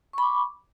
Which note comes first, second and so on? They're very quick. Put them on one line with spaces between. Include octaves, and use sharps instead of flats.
C#6 B5 D6